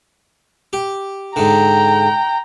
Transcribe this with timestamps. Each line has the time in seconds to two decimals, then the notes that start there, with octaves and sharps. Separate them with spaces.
0.73 G4
1.36 G#2 D3 G5 A#5